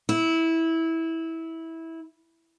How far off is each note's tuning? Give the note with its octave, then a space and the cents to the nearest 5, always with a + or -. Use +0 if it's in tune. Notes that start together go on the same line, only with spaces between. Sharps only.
E4 -15